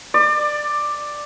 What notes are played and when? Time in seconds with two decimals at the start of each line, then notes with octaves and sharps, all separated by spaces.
0.14 D5